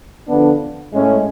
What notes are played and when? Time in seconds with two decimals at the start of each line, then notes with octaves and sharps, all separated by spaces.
0.28 D3 F3 B3 D4
0.93 A2 G#3 C#4